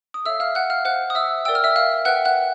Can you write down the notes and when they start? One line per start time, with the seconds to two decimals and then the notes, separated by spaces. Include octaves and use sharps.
0.14 D#6
0.25 A4 C#5 E5 F5 E6
0.40 F5 F6
0.55 F#5 F#6
0.70 F5 F6
0.85 C5 F5 F#5 F#6
1.10 D#6
1.15 E5 E6
1.45 A#4 D5 G5 E6
1.55 F6
1.64 E5 E6
1.76 F5 F6
2.05 B4 E5 F#5 G5 F#6
2.25 F#5 F#6